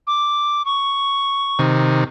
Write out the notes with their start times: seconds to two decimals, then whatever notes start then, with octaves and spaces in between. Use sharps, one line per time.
0.07 D6
0.65 C#6
1.59 C3 D#3